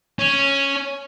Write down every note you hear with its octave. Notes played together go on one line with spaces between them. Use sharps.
C#4